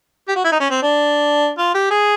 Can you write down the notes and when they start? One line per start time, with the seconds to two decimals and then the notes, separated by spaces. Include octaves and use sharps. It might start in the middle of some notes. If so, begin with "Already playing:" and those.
0.28 G4
0.36 F#4
0.44 E4
0.52 D#4
0.60 C#4
0.70 C4
0.82 D4
1.58 F4
1.74 G4
1.90 G#4